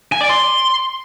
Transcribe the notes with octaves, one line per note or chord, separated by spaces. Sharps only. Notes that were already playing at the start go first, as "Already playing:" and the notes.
G#5
D5
C6